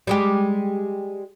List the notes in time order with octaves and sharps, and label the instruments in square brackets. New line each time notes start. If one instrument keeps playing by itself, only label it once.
[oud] G3 G#3 G4